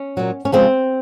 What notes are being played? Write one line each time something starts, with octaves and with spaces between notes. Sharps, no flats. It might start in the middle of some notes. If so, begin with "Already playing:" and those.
Already playing: C#4
A#2 F#3
C#4
C#3 F3 G#3 C4